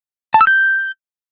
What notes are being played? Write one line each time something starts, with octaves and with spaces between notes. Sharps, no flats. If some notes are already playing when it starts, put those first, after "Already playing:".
A5
E6
G6